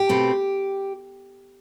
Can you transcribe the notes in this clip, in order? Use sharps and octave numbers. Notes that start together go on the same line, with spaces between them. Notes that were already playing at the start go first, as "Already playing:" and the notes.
Already playing: G4
B2 A3 C4